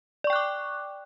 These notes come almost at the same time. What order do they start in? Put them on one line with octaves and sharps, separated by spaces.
D5 C#6 G5 F#6 D6